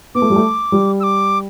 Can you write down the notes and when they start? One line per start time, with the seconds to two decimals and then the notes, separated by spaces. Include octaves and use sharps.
0.15 B3 D6
0.22 A3
0.30 G3
0.36 A3
0.72 G3
1.00 E6
1.03 D6